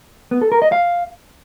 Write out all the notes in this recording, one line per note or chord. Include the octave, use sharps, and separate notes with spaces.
B3
A4
A#4
D#5
F5